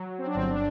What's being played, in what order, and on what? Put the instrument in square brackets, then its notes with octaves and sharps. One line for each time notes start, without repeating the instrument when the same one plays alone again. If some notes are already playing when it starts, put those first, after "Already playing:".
Already playing: [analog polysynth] F#3
C4
D4
G1 C4
D4